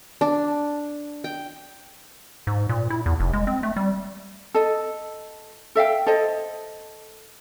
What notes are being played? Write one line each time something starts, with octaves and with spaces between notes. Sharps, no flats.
D4
G5
G#2
A#2
E4
E2
F1
G#3
C4
A3
G3
A4 D#5
A4 E5 F5 G5
A4 C5 D#5